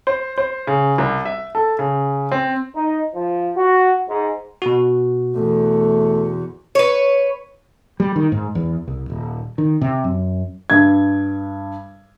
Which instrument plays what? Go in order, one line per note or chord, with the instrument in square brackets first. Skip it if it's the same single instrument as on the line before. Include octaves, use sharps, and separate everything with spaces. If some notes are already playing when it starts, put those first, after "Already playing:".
[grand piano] C5
C5
C#3
C2
E5
A4
C#3
C4
[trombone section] D#4
F3
F#4
G#2
[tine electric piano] B2 F#4
[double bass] E2 [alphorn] A3
[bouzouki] B4 C#5
[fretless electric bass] G3
D#3
G#2
E2
C2
D#1
D#3
C3
F#2
[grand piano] G2 G#6